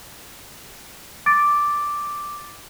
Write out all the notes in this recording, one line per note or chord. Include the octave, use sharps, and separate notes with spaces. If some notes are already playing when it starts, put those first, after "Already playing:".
D6 A6 D7